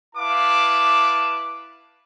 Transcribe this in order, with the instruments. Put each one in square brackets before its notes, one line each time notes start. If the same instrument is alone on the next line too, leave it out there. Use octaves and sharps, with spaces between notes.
[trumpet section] E4 B4 F5 A5 D6